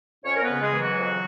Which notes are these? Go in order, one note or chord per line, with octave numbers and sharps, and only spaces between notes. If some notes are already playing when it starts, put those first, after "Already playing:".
F2 C#4 C#5
A#4
B3 B4
C#3
G#3 G#4
E3
F#3 F#4
F2